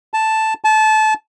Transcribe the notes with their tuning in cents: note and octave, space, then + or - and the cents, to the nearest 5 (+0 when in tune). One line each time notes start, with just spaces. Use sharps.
A5 +0
A5 -25